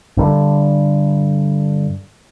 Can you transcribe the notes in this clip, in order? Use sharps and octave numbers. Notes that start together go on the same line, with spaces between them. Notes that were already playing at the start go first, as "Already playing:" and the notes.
G2 D3